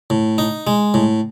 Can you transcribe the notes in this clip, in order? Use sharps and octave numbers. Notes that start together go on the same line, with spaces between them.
A2
D#4
G#3
A2